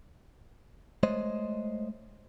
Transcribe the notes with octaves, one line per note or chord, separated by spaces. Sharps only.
G#3 A3 C5 C#5 D#5